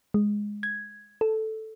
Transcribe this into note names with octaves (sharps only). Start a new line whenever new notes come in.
G#3
G#6
A4